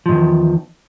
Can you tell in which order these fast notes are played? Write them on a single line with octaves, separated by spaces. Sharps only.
F3 G#2 D#3 E2